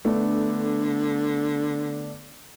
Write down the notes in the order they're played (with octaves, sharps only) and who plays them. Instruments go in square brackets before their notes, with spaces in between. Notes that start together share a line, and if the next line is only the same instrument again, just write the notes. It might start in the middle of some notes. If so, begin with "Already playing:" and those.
[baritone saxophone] D3 [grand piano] A3 B3 D4